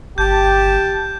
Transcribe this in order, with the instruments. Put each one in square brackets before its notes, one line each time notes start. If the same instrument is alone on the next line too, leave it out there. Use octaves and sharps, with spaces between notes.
[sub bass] G1 [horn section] G4 A5 [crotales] G6